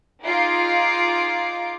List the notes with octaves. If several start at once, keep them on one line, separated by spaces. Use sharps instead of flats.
D#4 F4 G#4 D6 C7 D7